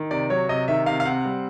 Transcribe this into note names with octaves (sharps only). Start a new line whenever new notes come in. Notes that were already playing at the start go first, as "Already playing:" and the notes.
Already playing: D#3
C3 D5
F#3 C#5
C3 D#5
D#3 E5
C3 F5
F5
C4 F#5
G3